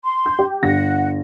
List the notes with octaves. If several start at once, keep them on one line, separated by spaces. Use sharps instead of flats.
C6
G6
G4
G1 F#5 A#6